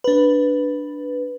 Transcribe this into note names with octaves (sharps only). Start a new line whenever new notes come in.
D4 B4